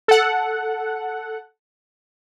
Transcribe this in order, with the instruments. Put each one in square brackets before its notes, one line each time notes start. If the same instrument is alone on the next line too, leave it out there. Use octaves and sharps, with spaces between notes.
[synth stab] A4 F#5